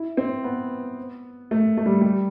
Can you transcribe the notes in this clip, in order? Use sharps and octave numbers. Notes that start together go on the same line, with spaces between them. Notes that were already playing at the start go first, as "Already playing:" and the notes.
Already playing: E4
C4
B3
A3
A3
G3
G3